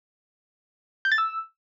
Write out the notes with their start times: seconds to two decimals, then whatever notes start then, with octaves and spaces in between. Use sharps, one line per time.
1.05 G6
1.12 A6
1.18 E6